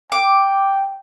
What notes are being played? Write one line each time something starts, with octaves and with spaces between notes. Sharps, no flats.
G5 D6